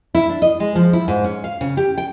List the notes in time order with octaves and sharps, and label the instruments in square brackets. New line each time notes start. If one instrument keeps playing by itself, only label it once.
[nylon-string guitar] E4
D4
D#5
G#3
F3
E4
G#2
C#4
F5
C#3
G4
G5